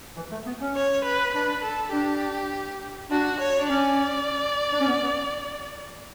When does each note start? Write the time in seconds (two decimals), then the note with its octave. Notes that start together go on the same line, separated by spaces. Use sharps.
0.16 E3
0.31 A3
0.46 B3
0.60 C#4
0.75 C#5
1.04 B4
1.34 D4 B4
1.63 A4
1.92 D4 G4
3.11 D4 F#4
3.40 C#5
3.58 D4
3.69 C#4 D5
4.73 D4
4.80 C#4
4.88 B3
5.02 B3